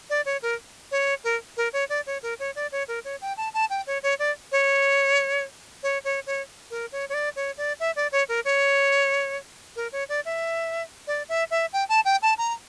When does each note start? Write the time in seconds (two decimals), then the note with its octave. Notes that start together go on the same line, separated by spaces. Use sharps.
0.10 D5
0.25 C#5
0.42 A#4
0.91 C#5
1.24 A#4
1.57 A#4
1.73 C#5
1.89 D5
2.06 C#5
2.22 A#4
2.39 C#5
2.55 D5
2.72 C#5
2.88 A#4
3.05 C#5
3.21 G5
3.37 A5
3.54 A5
3.70 G5
3.87 C#5
4.03 C#5
4.19 D5
4.52 C#5
5.83 C#5
6.04 C#5
6.26 C#5
6.70 A#4
6.92 C#5
7.09 C#5
7.14 D5
7.36 C#5
7.57 D5
7.80 E5
7.96 D5
8.12 C#5
8.29 A#4
8.45 C#5
9.76 A#4
9.92 C#5
10.09 D5
10.25 E5
11.07 D5
11.29 E5
11.51 E5
11.73 G5
11.89 A5
12.05 G5
12.22 A5
12.38 A#5